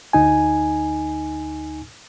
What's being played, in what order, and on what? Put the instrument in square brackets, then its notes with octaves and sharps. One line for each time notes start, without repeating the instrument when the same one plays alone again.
[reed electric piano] D2 D#4 G#5